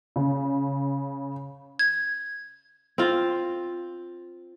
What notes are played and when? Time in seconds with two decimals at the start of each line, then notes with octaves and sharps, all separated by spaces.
0.16 C#3
1.79 G#6
2.98 C4 F4